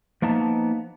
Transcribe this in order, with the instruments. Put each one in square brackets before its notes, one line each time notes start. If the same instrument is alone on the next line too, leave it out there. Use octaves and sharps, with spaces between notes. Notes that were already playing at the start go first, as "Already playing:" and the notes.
[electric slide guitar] F3 A#3 B3 D#4 A5